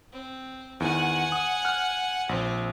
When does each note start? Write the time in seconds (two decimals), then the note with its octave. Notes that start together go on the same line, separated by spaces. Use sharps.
0.12 C4
0.80 E2 D#3 F#5 G#5
1.32 D#6
1.65 F6 F#6
2.29 A#1 C4